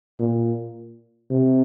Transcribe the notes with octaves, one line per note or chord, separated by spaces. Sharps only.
A#2
C3